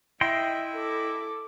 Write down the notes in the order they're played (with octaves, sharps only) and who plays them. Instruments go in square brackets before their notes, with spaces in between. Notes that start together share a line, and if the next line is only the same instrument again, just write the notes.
[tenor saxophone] E4 [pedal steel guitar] D#5 G5 C6 [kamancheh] E5
[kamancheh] A4 D6